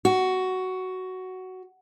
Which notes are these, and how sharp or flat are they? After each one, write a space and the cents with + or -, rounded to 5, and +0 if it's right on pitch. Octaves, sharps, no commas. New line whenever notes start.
F#4 +10